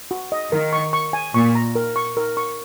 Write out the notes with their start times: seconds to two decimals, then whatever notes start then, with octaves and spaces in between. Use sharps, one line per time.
0.11 F#4
0.32 D#5
0.52 D#3 A#4
0.73 C#6
0.93 C#6
1.13 G#5
1.34 A#2 C#6
1.55 A#5
1.75 A#4
1.96 C#6
2.17 A#4
2.37 C#6